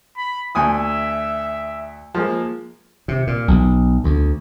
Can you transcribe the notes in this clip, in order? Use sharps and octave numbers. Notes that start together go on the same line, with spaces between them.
B5
D2 E5 G#5 D#6
F3 G#3 A#3
C3
A#2
B1
D2